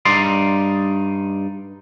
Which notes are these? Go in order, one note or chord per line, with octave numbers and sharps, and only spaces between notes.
G2 D#4 D5 C6